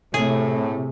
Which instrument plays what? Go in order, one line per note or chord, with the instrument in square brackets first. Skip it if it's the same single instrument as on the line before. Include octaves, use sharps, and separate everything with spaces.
[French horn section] A2 [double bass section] C3 [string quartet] A3 [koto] G#4